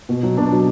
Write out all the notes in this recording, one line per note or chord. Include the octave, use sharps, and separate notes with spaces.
B2
F#3
B2 D4
F#3